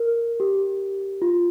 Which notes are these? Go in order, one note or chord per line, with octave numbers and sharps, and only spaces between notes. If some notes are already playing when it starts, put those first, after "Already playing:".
Already playing: A#4
G4
F4